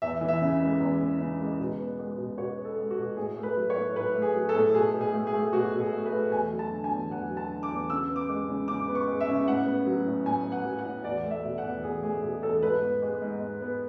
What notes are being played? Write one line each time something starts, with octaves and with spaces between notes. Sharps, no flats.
E2 E5
E3
E5
C#3
G#3
E2
E3
C#3
G#3
B2
B3
G#3
B2
B2 C#5
B3
A4
G#3
F#4
B2
A2 G#4
A3
B4
F#3
C#5
A2
A2 B4
A3
G#4
F#3
A4
A2
B2 G#4
B2
G#4
A3
G#4
A3
B2 F#4
B2
G#4
A3
B4
A3
E2 G#5
F#3
A5
D3
G#5
E2
E2 F#5
F#3
A5
D3
D6
E2
C#3 E6
B3
D6
G#3
C#3
C#3 D6
B3
C#6
G#3
E5
C#3
A2 F#5
B3
F#3
A2
A2 G#5
B3
F#5
F#3
F#5
A2
E2 D5
A3
E5
B2
F#5
E2
E2 G#4
A3 G#4
B2 G#4
E2 A4
G#2 B4
B3
G#3
G#2
G#2
B3